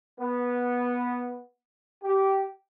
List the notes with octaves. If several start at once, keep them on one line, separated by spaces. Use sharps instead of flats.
B3
G4